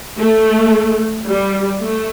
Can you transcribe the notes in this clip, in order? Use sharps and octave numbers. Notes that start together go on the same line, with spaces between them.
A3
G3
A3